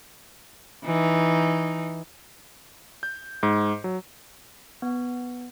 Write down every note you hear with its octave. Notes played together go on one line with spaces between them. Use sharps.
E3 D#4
G6
G#2
F#3
B3